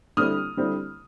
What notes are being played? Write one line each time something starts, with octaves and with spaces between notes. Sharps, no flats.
D3 G3 C4 E4 D#6 F6
D3 G3 C4 E4